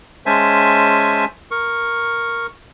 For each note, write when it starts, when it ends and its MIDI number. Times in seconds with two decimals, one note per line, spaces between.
0.26 1.25 56
0.26 1.25 61
0.26 1.25 72
0.26 1.25 76
0.26 1.25 80
0.26 1.25 81
1.51 2.47 70
1.51 2.47 85